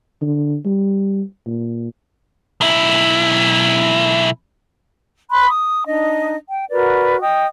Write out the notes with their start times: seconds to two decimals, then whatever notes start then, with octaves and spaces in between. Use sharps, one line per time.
0.22 D3
0.65 G3
1.47 A#2
2.61 B1 E4
5.30 B5 C6 F#6
5.49 D#6
5.86 D4 D#4 D#5
6.49 G5
6.71 F#4 A#4 B4 D5
7.20 D#5 G5 D#6